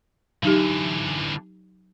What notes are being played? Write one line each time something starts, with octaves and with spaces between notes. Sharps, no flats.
D3 E3 F#3 D#4 G4